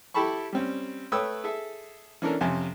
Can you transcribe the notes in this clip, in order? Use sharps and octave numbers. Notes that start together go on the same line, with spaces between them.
E4 G4 A4 A5 B5 C#6
G3 C4 C#4
A3 B4 C#5 G5 D#6 E6
G#4 A4 E5
E3 C#4 D4 A4 A#4
F2 C3 C#4 G#5